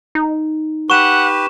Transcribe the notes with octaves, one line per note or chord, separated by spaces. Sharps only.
D#4
G4 B4 F#5 C#6 E7